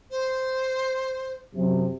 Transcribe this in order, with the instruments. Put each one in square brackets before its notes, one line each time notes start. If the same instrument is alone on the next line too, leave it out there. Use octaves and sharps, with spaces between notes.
[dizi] C5
[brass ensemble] F#2 C3